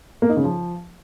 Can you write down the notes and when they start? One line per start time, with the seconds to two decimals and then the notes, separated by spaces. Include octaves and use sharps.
0.22 A#3
0.29 D#4
0.37 C#3
0.44 F3